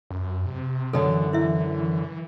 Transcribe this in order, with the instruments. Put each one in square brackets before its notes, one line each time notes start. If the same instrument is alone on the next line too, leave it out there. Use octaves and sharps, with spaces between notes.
[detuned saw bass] F#2
C3
[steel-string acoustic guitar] F#2 D3 [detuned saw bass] E3 [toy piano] A4
[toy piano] E4 E5